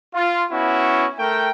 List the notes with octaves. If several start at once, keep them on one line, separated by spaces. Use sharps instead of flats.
F4
B3 C#4 E4 F#4
A3 A#4 G5